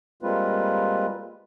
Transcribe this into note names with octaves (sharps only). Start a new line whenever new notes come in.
G3 G#3 A#3 C4 F4 B4